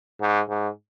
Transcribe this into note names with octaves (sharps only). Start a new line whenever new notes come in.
G#2
G#2